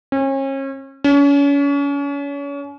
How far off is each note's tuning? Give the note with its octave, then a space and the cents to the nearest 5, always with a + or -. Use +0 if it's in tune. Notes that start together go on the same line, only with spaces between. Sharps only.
C#4 -35
C#4 +35